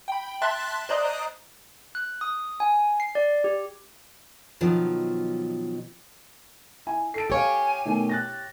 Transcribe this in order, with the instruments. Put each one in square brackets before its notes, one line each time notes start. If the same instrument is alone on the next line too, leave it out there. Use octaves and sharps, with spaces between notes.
[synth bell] G5 B5
E5 A5 C6 F#6 A6 B6
C5 D5 D#5 A#5 D#6 F#6
[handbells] F#6
D#6
G#5
C7
D5
G4
[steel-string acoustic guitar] B2 D#3 F3 F#3
[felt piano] E4 G#5
[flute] A4 [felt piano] C7 D7
[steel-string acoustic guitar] G4 C#5 [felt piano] A4 F5 [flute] G#5
[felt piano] B2 D#3 A3
F#6 A6 A#6